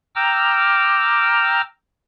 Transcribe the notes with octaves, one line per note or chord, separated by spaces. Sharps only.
G5 A#5 D6 E6 F6